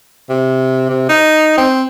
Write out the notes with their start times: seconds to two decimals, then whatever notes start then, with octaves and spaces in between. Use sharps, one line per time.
0.30 C3
0.90 C3
1.09 D#4
1.58 C4